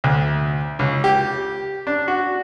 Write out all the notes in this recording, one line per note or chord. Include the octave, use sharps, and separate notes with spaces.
D2
C#2
G4
D4
F#4